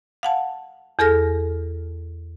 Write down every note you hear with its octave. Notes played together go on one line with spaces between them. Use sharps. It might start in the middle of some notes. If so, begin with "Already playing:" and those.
F5 F#5 A5
E2 G#4 A4 F6 A#6